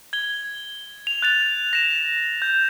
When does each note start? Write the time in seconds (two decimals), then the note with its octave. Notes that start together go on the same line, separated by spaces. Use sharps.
0.13 G#6 G7
1.07 F7
1.22 F#6 A6 F7
1.73 A#6 E7
2.42 G6